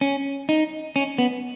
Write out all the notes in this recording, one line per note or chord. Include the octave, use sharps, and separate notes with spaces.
C#4
D#4
C#4
B3